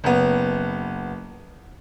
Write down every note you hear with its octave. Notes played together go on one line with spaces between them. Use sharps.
F#1 B3